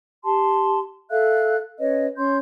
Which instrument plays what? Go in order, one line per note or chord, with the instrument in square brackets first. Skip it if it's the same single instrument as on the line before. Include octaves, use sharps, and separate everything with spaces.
[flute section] G4 A5 C6
A4 E5 F5 F#6
C#4 B4 C#5 D#5
C#4 C#5 C6 G6